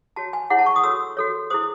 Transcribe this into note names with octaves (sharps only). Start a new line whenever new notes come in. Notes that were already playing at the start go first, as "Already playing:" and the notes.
F#4 C#5 A5
G#5
E4 G#4 C#5 F#5
A5
C#6
D#6
F#4 A4 C#5 E6
F#4 A4 C#5
E4 G#4 C5 D#6